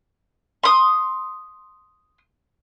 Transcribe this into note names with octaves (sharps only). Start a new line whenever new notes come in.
C6 D#6